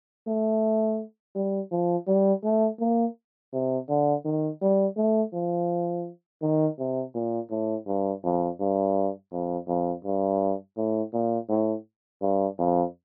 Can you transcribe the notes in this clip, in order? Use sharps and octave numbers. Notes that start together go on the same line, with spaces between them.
A3
G3
F3
G3
A3
A#3
C3
D3
D#3
G3
A3
F3
D#3
C3
A#2
A2
G2
F2
G2
F2
F2
G2
A2
A#2
A2
G2
F2